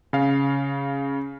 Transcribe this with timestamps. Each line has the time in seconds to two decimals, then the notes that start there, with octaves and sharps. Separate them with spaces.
0.13 C#3 F5